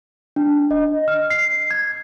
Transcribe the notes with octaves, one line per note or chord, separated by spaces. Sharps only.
D4
D#5
F6
C7
G#6